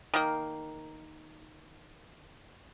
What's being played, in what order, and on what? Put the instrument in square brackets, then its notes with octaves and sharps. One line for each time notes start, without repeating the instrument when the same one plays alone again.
[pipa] D#3 A#3